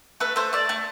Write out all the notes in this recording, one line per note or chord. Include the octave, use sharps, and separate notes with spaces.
A3 B4
A3 C5
A3 D5
A3